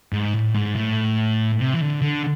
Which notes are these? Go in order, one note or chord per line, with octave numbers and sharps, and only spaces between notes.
G#2
A2
G#2
A2
C3
E3
D3
D3